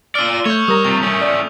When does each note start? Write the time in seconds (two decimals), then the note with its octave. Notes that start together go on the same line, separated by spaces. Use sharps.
0.15 F4 D5 E6 F6
0.46 A3 C#5 C#6 G6
0.68 G3 A#4 A#5 D#6
0.84 C3 A3 F7
1.03 A3 C#4
1.22 D5